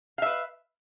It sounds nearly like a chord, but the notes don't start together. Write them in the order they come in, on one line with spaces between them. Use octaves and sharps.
F5 E5 B4